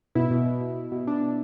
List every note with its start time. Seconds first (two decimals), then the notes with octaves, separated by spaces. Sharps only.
0.15 B2 E4
0.31 B2
0.46 B2
0.61 B2
0.76 B2
0.92 B2
1.07 B2 D4
1.22 B2